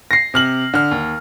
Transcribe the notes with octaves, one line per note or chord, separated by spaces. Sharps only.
A#6 C7
C3 F6 F#7
D3 F6
D#2